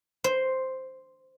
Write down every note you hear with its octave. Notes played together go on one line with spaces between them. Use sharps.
C5